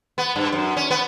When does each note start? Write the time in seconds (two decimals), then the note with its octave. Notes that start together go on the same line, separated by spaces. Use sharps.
0.18 B3
0.36 G2
0.52 F#2
0.77 C#4
0.90 B3